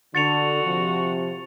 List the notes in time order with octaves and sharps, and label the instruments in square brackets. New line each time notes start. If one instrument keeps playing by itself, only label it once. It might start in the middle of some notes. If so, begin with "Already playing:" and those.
[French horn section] D3 [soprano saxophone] F#4 [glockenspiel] A6 C#7 F7
[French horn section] C3 F3